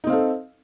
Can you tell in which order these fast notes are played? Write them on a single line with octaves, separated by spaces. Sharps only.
D#4 C4 F5 A4